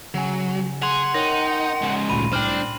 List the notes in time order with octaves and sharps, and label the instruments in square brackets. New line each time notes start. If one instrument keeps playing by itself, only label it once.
[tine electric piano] C#3 G#5 [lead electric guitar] F#3
[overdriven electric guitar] G#4 [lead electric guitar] F#5 [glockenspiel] C6 F7
[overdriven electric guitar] D#4 [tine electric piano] A#4 C#5 G5 [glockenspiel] A#6
[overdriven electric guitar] G#2 C#3
[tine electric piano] G#1 D2 A#2 [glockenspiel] B5 D#7
[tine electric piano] C2 A2 G3 [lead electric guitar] D4 [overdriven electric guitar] C5 G5 [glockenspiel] F6 F#7